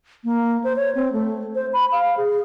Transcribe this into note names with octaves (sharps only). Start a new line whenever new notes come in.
A#3
C5
C#5
C4
A3
C5
B5
F5
G#4